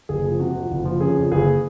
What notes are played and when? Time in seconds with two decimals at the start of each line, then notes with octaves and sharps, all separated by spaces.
0.09 F#1 G#4
0.25 F3
0.39 C3 F#4
0.55 F2
0.71 F#1
0.85 F3
1.01 C#3 G#4
1.16 F2
1.31 F#1 G#4